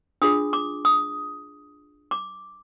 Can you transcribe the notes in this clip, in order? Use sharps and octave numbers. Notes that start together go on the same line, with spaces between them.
D4 F4 G#4 D#6
D6
D#6
D6